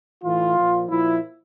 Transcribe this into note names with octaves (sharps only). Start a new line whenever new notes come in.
A2 E3 F4
A#2 F3
A#2 F3 E4